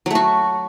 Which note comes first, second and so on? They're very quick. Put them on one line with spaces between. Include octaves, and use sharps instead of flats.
F#3 A3 F#4